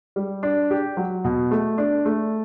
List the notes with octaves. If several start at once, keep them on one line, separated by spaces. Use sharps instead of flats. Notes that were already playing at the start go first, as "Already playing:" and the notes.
G3
D4
G4
F#3
B2
A3
D4
A3